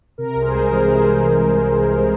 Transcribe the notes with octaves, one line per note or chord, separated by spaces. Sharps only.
C3 A#4
C2
G#4 C5
G#3
A#4
E3
C3 G#4 C5